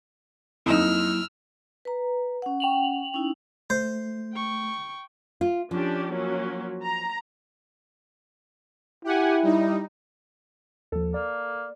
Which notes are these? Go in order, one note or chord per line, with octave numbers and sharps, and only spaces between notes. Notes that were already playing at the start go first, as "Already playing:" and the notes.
F2 F#3 A#3 D#4 E4 E6 F6
B4 A#5
C#4 F#5
G5 F7 F#7
C#4 D#4 E4
A3 C5
G5 C#6
F4
F3 C#4 D4 G4
F#3 A#3 C#4
A#5
E4 G4 F#5 G#5
G3 D#4
D#2 F3 A4
A#3 D5